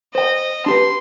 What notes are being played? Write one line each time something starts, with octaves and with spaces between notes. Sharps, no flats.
C5 D#5 G5
D4 G4 B4 C6